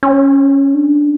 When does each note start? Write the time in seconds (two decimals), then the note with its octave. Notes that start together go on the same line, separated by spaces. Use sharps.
0.03 C#4
0.74 D4